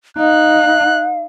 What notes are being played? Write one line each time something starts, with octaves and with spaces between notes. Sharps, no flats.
D#4 F5 F#6